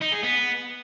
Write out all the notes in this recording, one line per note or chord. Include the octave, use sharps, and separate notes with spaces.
D#4
G#4
B3